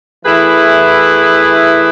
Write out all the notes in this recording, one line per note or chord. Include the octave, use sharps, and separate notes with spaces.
E3 A3 E4 G#4 B4